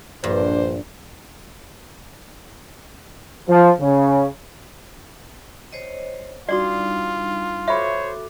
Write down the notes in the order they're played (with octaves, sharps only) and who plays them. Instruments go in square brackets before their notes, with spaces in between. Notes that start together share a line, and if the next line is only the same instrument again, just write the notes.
[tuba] A#1 [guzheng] G2 [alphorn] D4 [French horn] C5
[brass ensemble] F3
C#3
[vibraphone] C5 C#5 D#5
[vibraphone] G3 D4 D#4 [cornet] F4 [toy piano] F#4 D5
[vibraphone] F#4 A4 D6 [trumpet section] C5 C#5 [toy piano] E5 B5